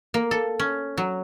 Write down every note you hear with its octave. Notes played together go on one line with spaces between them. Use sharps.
A#3
A4
C#4
F#3